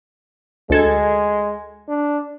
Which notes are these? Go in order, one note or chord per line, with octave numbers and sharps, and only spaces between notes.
D2 G#3 A4 G#6
D4